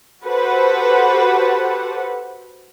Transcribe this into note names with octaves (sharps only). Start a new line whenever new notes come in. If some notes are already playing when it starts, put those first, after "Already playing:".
F#4 G4 A4 B4 C5 F#5